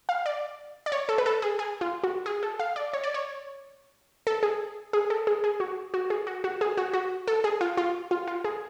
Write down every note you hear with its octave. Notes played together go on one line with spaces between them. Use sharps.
F5
D5
D5
C#5
A4
B4
A4
G#4
G#4
F4
F#4
G#4
A4
F5
D5
C#5
D5
C#5
A4
G#4
G#4
A4
G#4
G#4
F#4
F#4
G#4
F#4
F#4
G#4
F#4
F#4
A4
G#4
F4
F4
F4
F4
G#4